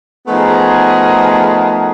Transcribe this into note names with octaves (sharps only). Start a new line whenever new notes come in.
F3 A3 B3 D#4 G#4 A#4